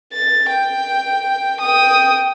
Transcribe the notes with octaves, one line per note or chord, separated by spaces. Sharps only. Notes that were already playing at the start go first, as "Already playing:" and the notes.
A6
G5
G5 D#6